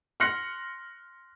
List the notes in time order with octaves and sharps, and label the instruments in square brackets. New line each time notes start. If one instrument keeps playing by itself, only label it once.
[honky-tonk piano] C6 F6 F#6 A#6 C#7